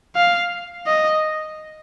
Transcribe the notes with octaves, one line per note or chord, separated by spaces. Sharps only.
F5
D#5